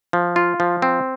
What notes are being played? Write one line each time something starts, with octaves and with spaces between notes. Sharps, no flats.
F3
F4
F3
C4